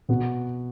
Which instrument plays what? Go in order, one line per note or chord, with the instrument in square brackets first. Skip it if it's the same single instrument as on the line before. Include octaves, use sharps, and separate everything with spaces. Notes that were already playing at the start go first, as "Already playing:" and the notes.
[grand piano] B2 B3 F#4